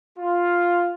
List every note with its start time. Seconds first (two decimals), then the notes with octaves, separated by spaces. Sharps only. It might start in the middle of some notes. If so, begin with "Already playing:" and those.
0.18 F4